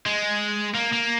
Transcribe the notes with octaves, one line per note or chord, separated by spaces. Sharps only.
G#3
A#3
A#3